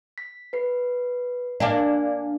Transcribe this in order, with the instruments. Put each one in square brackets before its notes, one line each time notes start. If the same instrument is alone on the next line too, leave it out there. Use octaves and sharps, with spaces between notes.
[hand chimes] B6
B4 C7
[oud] A#3 D4 [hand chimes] D5 F5 G#5